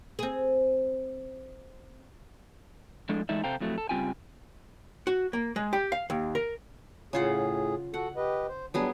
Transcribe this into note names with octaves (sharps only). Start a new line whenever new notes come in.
C4 G#4
A2 F3 G#3 D4 A4
E3 G#3 A3 D#4 D5 E5
C3 A4 C5 F5 G5 A#5
F2 A2 F#3 A3
A4
C#3 G3 C4 F4 G5 G#5
F#4
A#3
G#3
G4
F5
D#2
A#4
A2 C#3 F4 G#4 F#5
F#4 A4 F#5
G4 B4 D#5
C5
F#3 G3 B3 D4 G#4